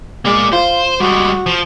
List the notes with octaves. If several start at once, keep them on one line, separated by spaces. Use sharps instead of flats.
G#3 A#3 D5
F4 C5
G3 G#3 F#4
F3